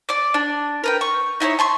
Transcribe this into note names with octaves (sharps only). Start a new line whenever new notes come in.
D5 D6
D4
A#4 B4 G5
C#6
D#4 E4 A4 C#5
A5 C6 C#6